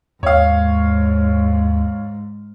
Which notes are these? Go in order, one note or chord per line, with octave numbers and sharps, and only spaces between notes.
D#2 G#2 C#5 F5